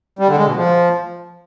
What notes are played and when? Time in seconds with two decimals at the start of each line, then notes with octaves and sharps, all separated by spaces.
0.19 G3
0.28 D3
0.37 G#3
0.46 B2
0.56 F3